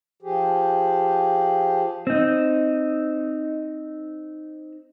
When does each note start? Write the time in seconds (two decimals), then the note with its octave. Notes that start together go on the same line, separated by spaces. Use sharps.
0.22 F3 G4 G#4
2.07 C4 D#4